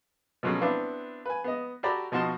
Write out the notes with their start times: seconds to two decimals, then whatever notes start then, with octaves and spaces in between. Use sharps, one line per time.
0.43 B2 F3 F#3 A3 C#4
0.61 B3 C4 D4 E4 B4
1.26 B4 G#5
1.44 B3 D#5
1.83 F#4 G4 A4 D5 A#5 B5
2.12 B2 F3 D#4 F#4 A5 C6